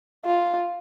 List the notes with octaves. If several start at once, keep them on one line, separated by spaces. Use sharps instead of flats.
F4